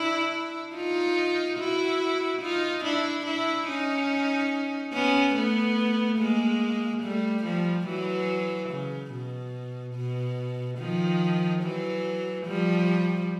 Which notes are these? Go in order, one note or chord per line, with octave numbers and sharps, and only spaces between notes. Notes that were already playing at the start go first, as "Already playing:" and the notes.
Already playing: D4 E4
D#4 F4
E4 F#4
D#4 F4
D4 E4
D4 E4
C#4 D#4
B3 C#4
A3 B3
G#3 A#3
G3 A3
F3 G3
E3 F#3
C#3
B2
B2
D#3 F3
E3 F#3
F3 G3